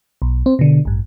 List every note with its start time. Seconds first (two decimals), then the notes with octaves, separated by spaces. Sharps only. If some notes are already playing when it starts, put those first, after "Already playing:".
0.22 B1
0.46 C4
0.59 B2 D3
0.85 A1 G2